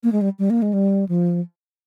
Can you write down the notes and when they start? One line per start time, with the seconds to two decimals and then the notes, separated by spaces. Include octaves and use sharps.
0.03 A#3
0.12 G#3
0.21 G3
0.39 G3
0.50 A#3
0.62 G#3
0.73 G3
1.09 F3